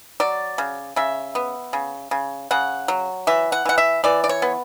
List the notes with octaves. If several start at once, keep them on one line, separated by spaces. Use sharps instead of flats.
F#3 D5
C#3
C#3 E5
B3
C#3
C#3
C#3 F#5
F#3
E3 E5
F#5
E3 F#5
E5
E3 D5
D5
C#5
B3